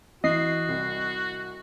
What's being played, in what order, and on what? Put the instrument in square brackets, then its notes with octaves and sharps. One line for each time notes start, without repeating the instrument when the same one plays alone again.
[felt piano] E3 [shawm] F#4 [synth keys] D#5 C7
[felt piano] C2